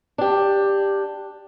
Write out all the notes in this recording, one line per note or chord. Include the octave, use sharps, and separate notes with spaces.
D4 G4